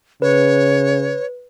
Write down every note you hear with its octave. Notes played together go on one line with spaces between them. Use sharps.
C#3 B4 C#5